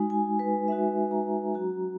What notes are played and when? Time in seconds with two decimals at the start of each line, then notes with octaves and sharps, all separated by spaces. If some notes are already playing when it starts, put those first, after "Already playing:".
Already playing: G#3 D#4 F#4 G#5
0.10 G#5
0.39 B4
0.68 G#3 D#4 F#4 E5
1.11 A#5
1.54 F#3 C#4 F#4 A#5